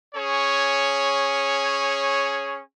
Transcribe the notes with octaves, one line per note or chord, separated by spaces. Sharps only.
C#4 G#4 C#5